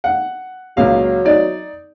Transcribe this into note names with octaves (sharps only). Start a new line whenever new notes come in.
F#5
C#2 A#2 F#3 F5
D#4 D5